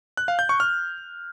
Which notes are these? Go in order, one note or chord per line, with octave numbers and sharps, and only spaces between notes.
F#6
F5
G6
C#6
F6